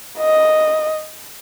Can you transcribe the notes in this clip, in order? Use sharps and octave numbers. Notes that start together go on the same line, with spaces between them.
D#5